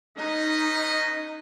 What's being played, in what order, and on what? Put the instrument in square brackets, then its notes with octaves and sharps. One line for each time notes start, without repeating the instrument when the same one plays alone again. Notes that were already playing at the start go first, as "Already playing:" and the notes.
[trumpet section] C#4 B4 D#5 [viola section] D#4